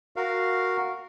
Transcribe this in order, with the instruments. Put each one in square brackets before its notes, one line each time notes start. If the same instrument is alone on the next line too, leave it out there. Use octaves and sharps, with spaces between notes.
[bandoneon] F#4 A#4 F5